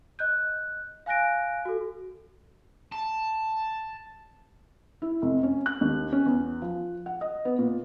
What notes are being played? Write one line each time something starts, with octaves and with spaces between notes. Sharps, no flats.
D#5 F#6 G6
F5 G#5 F#6 A#6 D7
F#4 A4
A5
E4
F1
C#4
F#6
D#2
C#4
E2
F3
F#5
D#5
B3
A#2